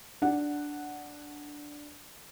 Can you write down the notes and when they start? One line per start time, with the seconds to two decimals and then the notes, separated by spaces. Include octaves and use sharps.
0.22 D4 F#5